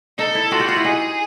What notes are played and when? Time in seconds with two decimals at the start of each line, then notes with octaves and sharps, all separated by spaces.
0.18 D#4 A4
0.35 E4
0.51 F4 F#4
0.60 G4
0.68 F4
0.76 E4
0.84 D#4 G#4